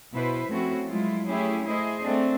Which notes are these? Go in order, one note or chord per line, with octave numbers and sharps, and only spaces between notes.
B2 E4 B4 C5 E5
F3 A3 C4 C#4 E4 F#4
F#3 G#3 E4 F4
A3 C#4 E4 G4 G#4
A3 E4 G#4 C5 D#5
A3 C4 D4